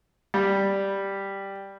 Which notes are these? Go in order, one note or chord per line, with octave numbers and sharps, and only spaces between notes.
G3